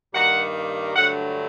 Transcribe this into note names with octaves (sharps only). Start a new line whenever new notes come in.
G2 D#3 G3 A#3 F#5
G2 D3 F#3 A3 F#5